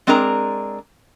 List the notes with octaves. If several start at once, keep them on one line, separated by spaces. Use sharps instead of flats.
G#3 C4 D4 G#4 A#4 A#5